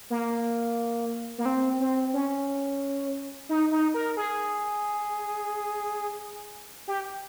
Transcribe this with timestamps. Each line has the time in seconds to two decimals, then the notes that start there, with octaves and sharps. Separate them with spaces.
0.10 A#3
1.38 A#3
1.45 C4
1.80 C4
2.13 C#4
3.49 D#4
3.72 D#4
3.94 A#4
4.17 G#4
6.88 G4